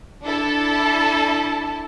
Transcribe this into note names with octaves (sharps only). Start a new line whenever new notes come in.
D4 E4 A4 A5